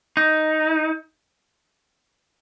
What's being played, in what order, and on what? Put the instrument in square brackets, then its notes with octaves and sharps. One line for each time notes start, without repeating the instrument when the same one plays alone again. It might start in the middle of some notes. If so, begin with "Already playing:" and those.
[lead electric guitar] D#4